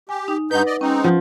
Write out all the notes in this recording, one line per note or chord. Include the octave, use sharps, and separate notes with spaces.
G4 G#5
D#4
G2 D#4 B4 F#5 G6
D5 D#5
G#3 C4 C#4 D#4
F3 F#5